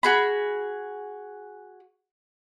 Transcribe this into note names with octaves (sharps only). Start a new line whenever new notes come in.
F#4 G#4 B5